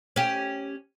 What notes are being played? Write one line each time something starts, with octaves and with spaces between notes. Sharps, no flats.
C#4 G4